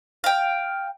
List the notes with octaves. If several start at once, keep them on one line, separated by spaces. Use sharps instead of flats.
F5 G5